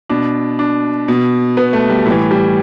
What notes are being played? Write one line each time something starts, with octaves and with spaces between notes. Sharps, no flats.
B2 D4
D4
B2
B3
A3
G3
A2 E3 G3
G3